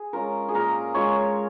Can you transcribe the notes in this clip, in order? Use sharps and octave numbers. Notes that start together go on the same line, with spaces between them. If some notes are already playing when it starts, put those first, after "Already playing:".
Already playing: G#4
G#3 C#4 F4 A#4
G#4
A#2 A#4
G#3 C#4 F4 C#5